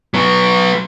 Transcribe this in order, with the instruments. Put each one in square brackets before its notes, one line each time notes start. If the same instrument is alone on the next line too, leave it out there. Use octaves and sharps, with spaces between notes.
[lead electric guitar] F#3 B3